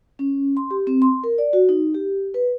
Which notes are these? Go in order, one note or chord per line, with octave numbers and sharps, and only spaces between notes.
C#4
C6
G4
C4
C6
A#4
D5
F#4
D#4
G4
B4